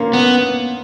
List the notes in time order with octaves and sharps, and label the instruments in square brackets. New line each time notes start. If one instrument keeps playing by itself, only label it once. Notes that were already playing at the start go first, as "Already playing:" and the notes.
Already playing: [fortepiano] A#2 A#3 C#4
[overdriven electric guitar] B3